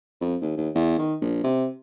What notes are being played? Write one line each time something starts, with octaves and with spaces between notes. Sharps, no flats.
F2
D#2
D#2
E2
D#3
A#1
C3